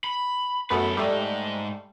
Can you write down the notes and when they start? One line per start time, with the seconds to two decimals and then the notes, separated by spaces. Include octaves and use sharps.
0.04 B5
0.70 F#2 A3 B3 A4 B4
0.97 G#2 G3 A3 D#4